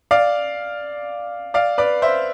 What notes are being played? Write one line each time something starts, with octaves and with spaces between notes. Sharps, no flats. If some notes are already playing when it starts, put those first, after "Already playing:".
D5 F5
D5 F5
B4 D5
C5 E5